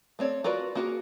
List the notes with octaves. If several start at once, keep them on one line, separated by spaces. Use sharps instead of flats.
A3 C4 C#5 D5
F4 F#4 A#4 B4 D5
A#3 F4 F#4 G#4 A#4